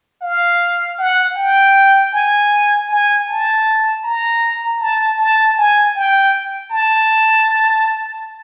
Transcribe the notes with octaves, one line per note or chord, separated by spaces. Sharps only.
F5
F#5
G5
G#5
G#5
A5
A#5
A5
A5
G#5
G5
A5